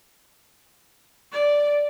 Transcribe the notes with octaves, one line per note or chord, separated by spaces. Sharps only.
D5